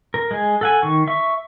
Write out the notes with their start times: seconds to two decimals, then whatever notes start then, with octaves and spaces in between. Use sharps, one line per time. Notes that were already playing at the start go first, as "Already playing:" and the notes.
0.14 A#4
0.31 G#3 G#4
0.61 A4 F#5 G#5
0.82 D#3 C#6
1.07 E5 C#6